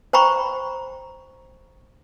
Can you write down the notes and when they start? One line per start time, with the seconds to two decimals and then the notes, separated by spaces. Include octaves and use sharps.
0.13 C5 G5 A#5 B5 C#6